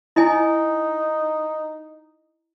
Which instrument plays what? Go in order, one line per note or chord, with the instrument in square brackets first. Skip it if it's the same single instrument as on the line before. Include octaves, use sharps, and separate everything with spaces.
[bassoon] D#4 [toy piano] E4 D#5 G#5